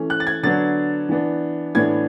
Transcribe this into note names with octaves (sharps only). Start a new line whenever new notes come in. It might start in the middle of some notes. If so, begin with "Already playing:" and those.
Already playing: E3 A3 C#4
F#6
A6
G#6
D3 F#3 B3 D4 A6
E3 B3 D4
A2 E3 B3 D4 G#6